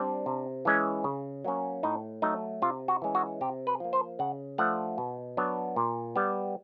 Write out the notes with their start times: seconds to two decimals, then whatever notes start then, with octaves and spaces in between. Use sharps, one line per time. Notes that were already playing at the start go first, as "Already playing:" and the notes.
Already playing: G3 C4 D4
0.26 C3
0.65 E3 G#3 C#4
1.04 C#3
1.44 F#3 A#3 C#4
1.83 A2 D#4
2.22 F#3 A3 D#4
2.62 C3 F4
2.88 F#4
3.02 E3 G#3 C#4
3.15 F#4
3.41 C3 G4
3.67 B4
3.80 F3 A#3
3.93 C5
4.19 C#3 F#5
4.58 F3 A3 D4 F#5
4.98 B2
5.37 F#3 B3 D4
5.76 A#2
6.16 G3 B3